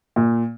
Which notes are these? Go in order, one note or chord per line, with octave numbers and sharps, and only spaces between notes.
A#2